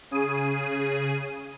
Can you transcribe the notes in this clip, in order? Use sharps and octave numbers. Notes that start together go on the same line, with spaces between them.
C#3 G#4 D#7